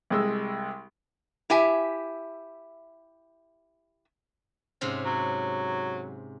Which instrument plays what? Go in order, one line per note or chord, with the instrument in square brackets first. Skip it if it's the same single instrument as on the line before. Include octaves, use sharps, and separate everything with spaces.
[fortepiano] C2 G#3 E6
[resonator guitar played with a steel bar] E4 G4 E5 G#5
[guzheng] G#2 C3 C#4
[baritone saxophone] F#3